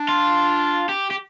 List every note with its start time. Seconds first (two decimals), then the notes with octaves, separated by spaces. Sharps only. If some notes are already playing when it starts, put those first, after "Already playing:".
Already playing: D4
0.09 F4
0.89 G4
1.11 G4